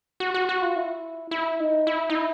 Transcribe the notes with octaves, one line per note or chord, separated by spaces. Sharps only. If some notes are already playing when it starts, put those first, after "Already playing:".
F#4
F#4
F#4
F4
E4
E4
D#4
E4
D#4
E4